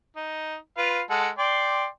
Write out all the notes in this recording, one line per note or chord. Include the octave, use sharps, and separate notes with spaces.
D#4
F4 B4 F5
G#3 A4 F#5
D5 G5 C6